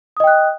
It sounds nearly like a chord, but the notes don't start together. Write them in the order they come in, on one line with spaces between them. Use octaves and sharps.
D#6 D#5 G5 F#6